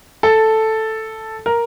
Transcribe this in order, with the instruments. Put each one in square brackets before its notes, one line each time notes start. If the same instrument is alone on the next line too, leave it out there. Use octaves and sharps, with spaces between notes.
[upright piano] A4
A#4